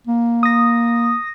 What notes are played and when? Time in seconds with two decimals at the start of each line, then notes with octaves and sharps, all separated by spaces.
0.07 A#3
0.43 D#6 A#6